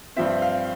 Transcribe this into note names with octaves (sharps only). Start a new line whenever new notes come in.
G2 F3 C4 E5
F5